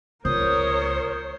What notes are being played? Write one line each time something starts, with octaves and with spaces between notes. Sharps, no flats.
C#2 A#4 C5 C#5 D#6